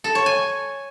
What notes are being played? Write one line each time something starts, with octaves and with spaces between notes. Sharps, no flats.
A4
C#5
G#5